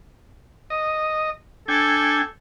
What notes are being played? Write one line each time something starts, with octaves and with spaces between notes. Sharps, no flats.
D#5
D4 A4 G5 G#5